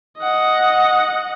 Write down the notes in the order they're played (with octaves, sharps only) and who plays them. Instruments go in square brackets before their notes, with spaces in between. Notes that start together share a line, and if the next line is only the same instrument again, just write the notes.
[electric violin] D#5 F#5